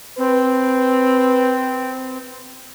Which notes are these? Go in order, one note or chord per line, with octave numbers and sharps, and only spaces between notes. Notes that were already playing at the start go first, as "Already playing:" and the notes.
C4 B4